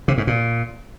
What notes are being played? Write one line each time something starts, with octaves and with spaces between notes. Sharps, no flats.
C3
G#2
A#2